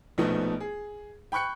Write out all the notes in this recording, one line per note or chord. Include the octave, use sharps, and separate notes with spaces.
A#1 B2 F3 A3 B3 D#4
G#4
G5 B5 C#6 F#6 C#7